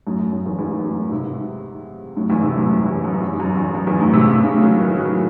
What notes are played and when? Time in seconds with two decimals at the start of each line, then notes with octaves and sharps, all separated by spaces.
0.07 F#2 A2
0.32 F#2
0.45 E2 G#2
0.58 E2 G#2
0.78 G#2
0.85 F#2 A2
1.06 C#3
1.11 G#2 C3
2.17 F#2 A2
2.30 E2 G#2
2.43 G#2 C3
2.56 F#2 A2
2.69 F#2
2.86 E2
3.04 F#2
3.21 E2
3.33 G#2
3.40 F#2
3.57 E2
3.75 F#2
3.87 E2 G#2
4.00 F#2 A2
4.13 G#2 C3
4.26 A2 C#3
4.44 A2 C#3
4.62 D#3 F#3
4.79 E3 G#3
4.97 D#3 F#3